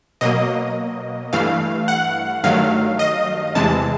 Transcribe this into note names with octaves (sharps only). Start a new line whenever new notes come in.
B2 F#3 A#3 D#5
G2 E3 A3 F5
F#5
G2 D#3 F#3 A3 F5
D#5
E2 C3 E3 G#3 A5